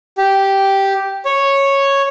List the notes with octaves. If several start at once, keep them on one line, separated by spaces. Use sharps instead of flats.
G4
C#5